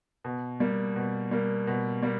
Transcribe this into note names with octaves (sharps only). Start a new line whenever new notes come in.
B2
G3 A#3
B2
G3 A#3
B2
G3 A#3